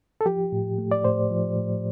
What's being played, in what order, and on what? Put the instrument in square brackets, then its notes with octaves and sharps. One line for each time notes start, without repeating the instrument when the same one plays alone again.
[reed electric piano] A4
F3 G4
A2
A3
D5
A2 C5
F3
A2